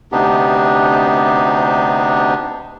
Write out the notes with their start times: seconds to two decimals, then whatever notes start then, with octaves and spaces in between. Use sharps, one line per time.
0.12 D2 C3 B3 D4 D#4 G4